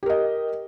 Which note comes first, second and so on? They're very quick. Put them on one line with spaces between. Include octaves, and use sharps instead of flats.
G4 A#4 D#5